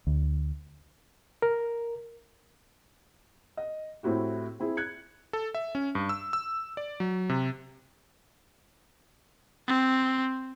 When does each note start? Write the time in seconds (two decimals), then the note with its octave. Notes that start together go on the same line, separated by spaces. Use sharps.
0.07 D2
1.42 A#4
3.57 D#5
4.03 A2 C4 E4 F#4 G4
4.60 C4 E4 G#4
4.77 F#6 G#6 C#7
5.33 A4
5.55 E5
5.75 C#4
5.95 G2
6.09 E6
6.33 E6
6.77 D5
7.00 F#3
7.29 C3
9.67 C4